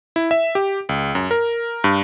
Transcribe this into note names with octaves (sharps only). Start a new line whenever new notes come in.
E4
E5
G4
C#2
F#2
A#4
G2